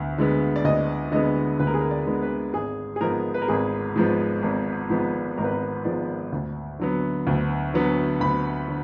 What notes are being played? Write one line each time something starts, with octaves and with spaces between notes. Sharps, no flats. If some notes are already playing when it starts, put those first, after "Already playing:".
Already playing: D2 D3 B3
D3 G#3 B3
D5
D2 D#5
D3 G#3 B3 D#5
D2 B4
A#4
G#4
A#4
D5
D3 G#3 B3
B4
G#1 G#4
G#4
G#2 F3 G#3 B3 A#4
B4
A#4
G#1 G#4
G#2 F3 G#3 B3
G#1
G#2 F3 G#3 B3
G#1 A#4
B4
A#4
G#2 F3 G#3 B3 D5
D2
D3 F#3 B3
D2
D3 F#3 B3
D2 B5
D3